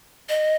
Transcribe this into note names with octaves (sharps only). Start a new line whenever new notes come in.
D#5